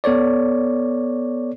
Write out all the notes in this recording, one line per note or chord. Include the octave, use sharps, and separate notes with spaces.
B3 A4 C#5 D5